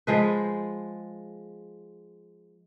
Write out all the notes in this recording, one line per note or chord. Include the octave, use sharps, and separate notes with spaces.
F3 G#3 B4